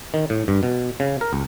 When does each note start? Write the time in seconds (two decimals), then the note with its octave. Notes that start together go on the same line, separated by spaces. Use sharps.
0.14 D#3
0.30 A2
0.48 G2
0.63 B2
1.00 C#3
1.21 A#4
1.33 C#2